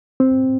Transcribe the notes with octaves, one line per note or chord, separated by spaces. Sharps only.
C4